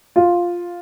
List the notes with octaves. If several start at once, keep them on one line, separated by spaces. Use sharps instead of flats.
F4